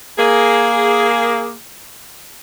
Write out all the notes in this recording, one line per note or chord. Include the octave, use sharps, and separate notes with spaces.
A#3 G#4